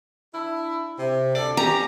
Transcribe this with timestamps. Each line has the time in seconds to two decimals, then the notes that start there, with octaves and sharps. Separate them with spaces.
0.32 D4 E4
0.97 C3
1.35 D2 A4 D5
1.57 C#4 G4 A#5